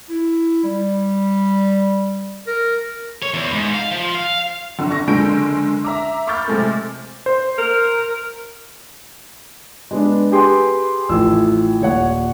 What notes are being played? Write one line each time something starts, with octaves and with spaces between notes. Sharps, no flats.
E4
G3
A#4
C#5
E2
G#2
F5
F3
F5
G1 D3
C#6 A#6
F#1 D3 G#3 G6 D7
E5 A#5 D6
B5 C#6 D6 F6 G6 A6
C3 G#3 A3
C5
A#4
G#3 B3 D4
G4 G#4 B4 G5 C6
A1 F3 E6
D#1 C#5 F#5